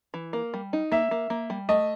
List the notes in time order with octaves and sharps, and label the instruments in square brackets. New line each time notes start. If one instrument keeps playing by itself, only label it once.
[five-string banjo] E3
A#3
G3
D#4
[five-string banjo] A#3 [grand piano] E5
[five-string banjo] A#3
A#3
G3
[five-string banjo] A3 [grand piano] D#5